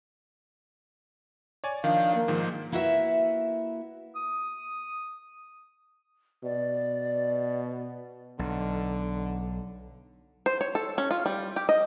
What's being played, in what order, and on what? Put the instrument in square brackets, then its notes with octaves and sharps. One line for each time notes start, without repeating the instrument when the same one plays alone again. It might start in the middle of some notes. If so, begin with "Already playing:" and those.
[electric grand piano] C#5 D5 G#5
[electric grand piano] D#3 F3 D4 [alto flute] F5
[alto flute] A#3
[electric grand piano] G#2 D#3 F3
[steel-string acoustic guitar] A#3 E4 F#4 B4 E5
[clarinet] D#6
[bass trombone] B2 [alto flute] D5
[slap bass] B1 [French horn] D3
[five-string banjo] C5
C#5
A4
C#4
F4
G3
G4
D#5